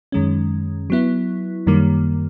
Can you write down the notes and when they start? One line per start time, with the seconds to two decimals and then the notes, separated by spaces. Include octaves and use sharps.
0.12 F#2 D#3 G#3 C#4
0.90 F#3 B3 E4
1.67 F#2 D#3 G3 A#3